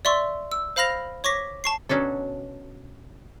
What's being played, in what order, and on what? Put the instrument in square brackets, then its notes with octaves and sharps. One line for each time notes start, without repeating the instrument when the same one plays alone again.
[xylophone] D5 E5 C6 C#6 E6
E6
C5 F5 B5 F6 A#6 F7
C#5 C#6 D6 A#6 B6
A5 C#6 C7
[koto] B2 F#3 C#4 D4 A4